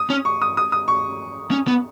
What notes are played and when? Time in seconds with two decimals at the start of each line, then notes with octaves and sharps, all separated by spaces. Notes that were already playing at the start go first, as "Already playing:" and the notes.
Already playing: D#6
0.10 C#4
0.25 C#6
0.42 D#6
0.57 D#6
0.72 D#6
0.88 C#6
1.51 C#4
1.68 B3